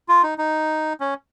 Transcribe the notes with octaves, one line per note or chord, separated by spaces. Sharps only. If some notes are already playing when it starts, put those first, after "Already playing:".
F4
D#4
D#4
C#4